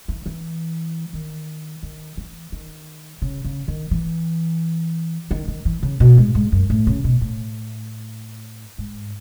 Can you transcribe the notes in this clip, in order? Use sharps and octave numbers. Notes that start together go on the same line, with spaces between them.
E3
E3
D#3
D#3
E3
D#3
C#3
C#3
D#3
E3
D#3
D#3
E3
C#3
B2
G#2
G#2
F#2
A2
C#3
B2
A2
G#2